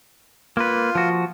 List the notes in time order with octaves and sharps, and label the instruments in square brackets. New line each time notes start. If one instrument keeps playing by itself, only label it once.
[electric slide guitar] A#3 B4 [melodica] F4
[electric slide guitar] F3 F#4